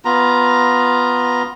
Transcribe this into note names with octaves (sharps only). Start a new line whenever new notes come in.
B3 F4 A#5